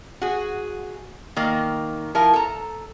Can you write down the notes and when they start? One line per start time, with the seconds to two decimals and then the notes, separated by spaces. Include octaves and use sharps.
0.22 F#4 G#4
1.36 D#3 A#3
2.15 F3 E4 A#4
2.33 A4 A#5